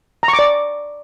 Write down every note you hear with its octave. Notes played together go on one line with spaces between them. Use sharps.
A#5
C#6
D6
D5